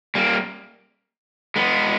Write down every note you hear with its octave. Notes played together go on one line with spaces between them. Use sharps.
G3 A#3
G#3 B3